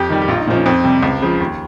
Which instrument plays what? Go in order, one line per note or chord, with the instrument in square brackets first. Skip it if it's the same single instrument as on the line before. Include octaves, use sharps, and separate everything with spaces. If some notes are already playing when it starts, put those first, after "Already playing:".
Already playing: [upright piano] F2 G4
D#3 G3
G4
A#1 F4
D#4
A#2 F3 D#4
C#4
F2 C4
C3 G3
C#2
C#3 F3
D#2